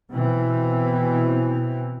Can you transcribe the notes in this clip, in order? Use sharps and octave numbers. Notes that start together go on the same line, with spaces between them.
B2 E3 C4